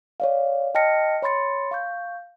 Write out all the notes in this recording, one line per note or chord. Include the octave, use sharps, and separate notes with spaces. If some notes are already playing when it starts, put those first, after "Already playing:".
C#5 D5 F5
D#5 G5 A5 F6 A#6 C#7
C#5 B5 C6 A6 C#7
F5 C#6 G6